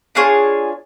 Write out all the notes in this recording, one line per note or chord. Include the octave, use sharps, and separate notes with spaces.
D4 F4 G#4 C#5